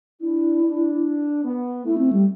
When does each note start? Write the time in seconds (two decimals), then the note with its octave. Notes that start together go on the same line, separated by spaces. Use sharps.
0.21 D4 E4
0.63 D4
1.44 B3
1.85 A3 E4
1.98 C4
2.13 G3